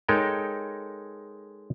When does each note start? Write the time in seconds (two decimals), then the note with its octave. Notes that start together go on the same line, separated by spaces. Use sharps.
0.08 G#3 D#4 A4 A#4 C#5 G5